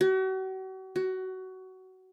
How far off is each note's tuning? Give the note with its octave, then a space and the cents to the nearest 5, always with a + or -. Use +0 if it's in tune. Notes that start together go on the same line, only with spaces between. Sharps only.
F#4 +40
F#4 +20